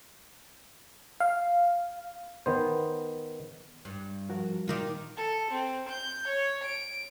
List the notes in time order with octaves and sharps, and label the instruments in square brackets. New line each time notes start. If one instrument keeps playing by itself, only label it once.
[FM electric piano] F5
[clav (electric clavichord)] D#3 B3 C5
[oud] G2
[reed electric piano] F3 F#4 A#4
[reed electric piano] A#2 A#4 D6 [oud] D#3 D#4 F4
[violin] A4
C4
G6
C#5
D7